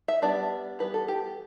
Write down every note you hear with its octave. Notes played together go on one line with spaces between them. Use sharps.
E5
G3 B3 D4 D5
E3 G3 B3 B4
A4
G4